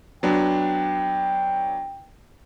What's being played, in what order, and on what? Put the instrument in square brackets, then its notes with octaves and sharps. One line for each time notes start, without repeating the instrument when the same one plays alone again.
[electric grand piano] F#3 B3 D4 [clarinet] G5